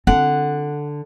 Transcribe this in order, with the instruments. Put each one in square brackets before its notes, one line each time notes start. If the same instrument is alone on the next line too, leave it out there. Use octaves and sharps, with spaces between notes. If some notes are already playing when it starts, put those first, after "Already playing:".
[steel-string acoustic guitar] D3 [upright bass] C4 F4 [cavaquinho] F#5